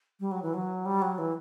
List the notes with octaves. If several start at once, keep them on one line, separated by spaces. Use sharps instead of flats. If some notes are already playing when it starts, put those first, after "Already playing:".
G3
F#3
E3
F#3
G3
F#3
E3